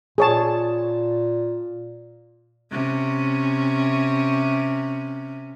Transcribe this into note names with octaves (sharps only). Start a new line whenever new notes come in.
A#2 G#4 C#5 A5
C3 C#4